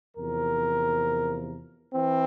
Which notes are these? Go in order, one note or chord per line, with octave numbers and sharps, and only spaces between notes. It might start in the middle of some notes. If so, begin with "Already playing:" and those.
E2 C3 F3 A#4
E3 C4